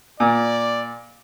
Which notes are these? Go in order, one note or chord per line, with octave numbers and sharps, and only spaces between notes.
A#2 D5